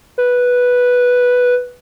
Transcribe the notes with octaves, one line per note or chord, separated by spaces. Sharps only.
B4